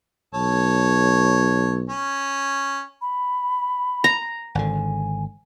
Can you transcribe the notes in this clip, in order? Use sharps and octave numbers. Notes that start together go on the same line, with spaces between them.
B1 A4 C#5
C#4
B5
A#5
G#1 D3 G#5